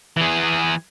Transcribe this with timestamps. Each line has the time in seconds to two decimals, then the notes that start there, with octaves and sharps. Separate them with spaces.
0.17 E3 G#4